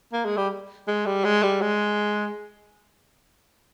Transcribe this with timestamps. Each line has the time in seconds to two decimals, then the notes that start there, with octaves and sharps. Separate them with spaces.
0.13 A#3
0.25 G#3
0.37 G3
0.87 G#3
1.06 G3
1.24 G#3
1.43 G3
1.62 G#3